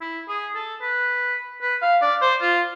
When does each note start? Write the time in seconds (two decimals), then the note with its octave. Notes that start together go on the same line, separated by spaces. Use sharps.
0.01 E4
0.29 G#4
0.55 A4
0.82 B4
1.62 B4
1.82 F5
2.01 D5
2.22 C5
2.42 F4